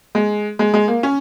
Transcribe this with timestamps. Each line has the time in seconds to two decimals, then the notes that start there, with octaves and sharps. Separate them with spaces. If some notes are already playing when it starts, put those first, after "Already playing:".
0.15 G#3
0.59 G#3
0.74 G#3
0.88 A#3
1.03 C#4